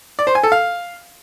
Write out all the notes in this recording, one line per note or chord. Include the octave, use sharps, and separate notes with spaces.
D5
C5
G#5
A4
F5